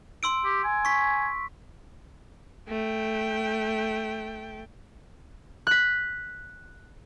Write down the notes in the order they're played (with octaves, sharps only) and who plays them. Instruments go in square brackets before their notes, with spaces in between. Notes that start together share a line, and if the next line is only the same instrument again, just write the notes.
[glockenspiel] C6 E6 D7
[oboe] G4
G#5
[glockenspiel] C#6 B6
[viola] A3 G5
[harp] F#6 B6